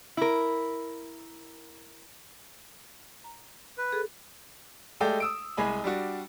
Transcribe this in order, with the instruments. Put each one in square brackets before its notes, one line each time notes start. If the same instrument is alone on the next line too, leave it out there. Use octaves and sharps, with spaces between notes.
[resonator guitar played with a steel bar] E4 A#4
[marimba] A#5
[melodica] B4
[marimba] G#4 A4
[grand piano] G#3 A3 G4 A4 D5 G5
D#6 E6 D7
C2 G#3 G#5 B5
G3 D4 F#4